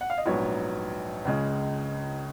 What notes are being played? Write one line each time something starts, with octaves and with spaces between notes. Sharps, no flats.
F#5
F5
D#5
A#1 G#2 F#3 B3 C#5
C#2 C#3 G#3